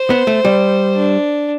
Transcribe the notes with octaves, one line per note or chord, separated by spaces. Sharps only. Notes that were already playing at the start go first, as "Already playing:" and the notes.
Already playing: C5
B3
A3
G3
D4